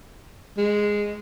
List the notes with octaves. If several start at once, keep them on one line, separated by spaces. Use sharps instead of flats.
G#3